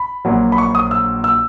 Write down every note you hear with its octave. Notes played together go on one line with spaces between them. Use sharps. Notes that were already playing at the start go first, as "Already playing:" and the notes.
Already playing: B5
A#1 A#2 F#3
B5
C#6
D#6
E6
E6